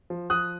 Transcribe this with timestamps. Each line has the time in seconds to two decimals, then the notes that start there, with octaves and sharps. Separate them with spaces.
0.10 F3
0.30 F3 D#6 F#6